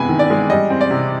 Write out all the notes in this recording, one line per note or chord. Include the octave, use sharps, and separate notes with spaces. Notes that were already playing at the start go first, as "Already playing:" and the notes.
Already playing: C3 G#3 B3 G#5 B5
D#3
D5
G#3
G3 D#5
C4
D5
C3